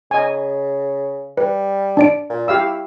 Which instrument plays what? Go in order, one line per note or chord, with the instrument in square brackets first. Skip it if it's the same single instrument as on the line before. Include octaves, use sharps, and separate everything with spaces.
[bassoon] C#3 [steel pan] D#5 G#5
[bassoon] G3 [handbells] B4
[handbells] D4 D5 D7
[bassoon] A#2
[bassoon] E4 [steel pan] G4 F5 E6